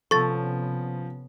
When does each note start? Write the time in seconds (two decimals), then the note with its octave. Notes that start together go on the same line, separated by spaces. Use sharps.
0.11 C3 F3 B3 C#4 A4 C#6 A6